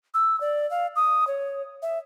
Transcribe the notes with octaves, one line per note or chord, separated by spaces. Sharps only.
E6
D5
F5
D#6
C#5
E5